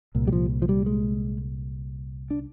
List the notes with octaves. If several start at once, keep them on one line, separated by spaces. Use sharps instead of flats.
C2 A#2
G3
F3
F3
G3
G#3
D4